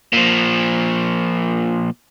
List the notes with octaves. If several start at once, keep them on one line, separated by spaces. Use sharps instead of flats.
A#2 F3